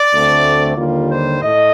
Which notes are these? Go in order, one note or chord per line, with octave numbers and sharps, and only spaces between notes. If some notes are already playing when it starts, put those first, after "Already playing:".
Already playing: D5
D2 D3 A3 C4
D#2 D3 G3 A#3 F4
C5
A2 A3 D#5